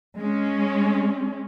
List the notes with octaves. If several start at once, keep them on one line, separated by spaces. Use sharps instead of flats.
G#3 C#4